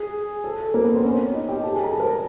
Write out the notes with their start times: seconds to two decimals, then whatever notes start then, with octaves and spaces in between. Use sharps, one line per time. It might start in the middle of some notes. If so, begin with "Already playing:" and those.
Already playing: G#4
0.44 A4
0.74 A#3 A#4
0.84 B3 B4
0.94 C4 C5
1.04 C#4 C#5
1.34 D#4 D#5
1.48 G4 G5
1.63 A4 A5
1.73 G#4 G#5
1.83 A#5
1.92 A5
2.00 A#4 A#5